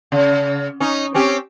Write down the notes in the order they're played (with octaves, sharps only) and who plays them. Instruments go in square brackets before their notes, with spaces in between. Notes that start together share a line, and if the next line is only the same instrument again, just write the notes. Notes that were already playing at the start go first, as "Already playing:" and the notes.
[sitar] C#3
C#4 D#4
C4 C#4 G4